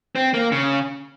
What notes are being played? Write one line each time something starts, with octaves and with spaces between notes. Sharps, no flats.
C4
A#3
C#3